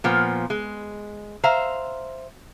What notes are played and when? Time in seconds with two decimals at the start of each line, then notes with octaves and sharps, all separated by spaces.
0.04 A#2 F3 B3
0.50 G#3
1.44 C5 E5 F5 A#5